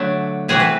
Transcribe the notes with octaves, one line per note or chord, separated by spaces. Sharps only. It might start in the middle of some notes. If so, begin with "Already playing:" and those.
Already playing: D3 F#3 A3 D4
C3 E3 A3 C4 F#4 G#4
B4